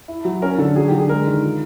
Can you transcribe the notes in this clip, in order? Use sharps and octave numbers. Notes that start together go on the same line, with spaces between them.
E4
F#3
C#4 A#4
D3 A4
F#3 G#4
G4
D3
G#4
G#3 A#4
D#3
F4